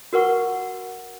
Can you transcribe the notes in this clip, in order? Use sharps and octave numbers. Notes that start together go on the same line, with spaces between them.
F#4 A#4 B4 F#5 C#6